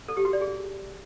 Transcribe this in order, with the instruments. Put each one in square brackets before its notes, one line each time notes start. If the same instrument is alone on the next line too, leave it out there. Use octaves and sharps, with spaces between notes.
[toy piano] A4
G4
F#4
D5
G#4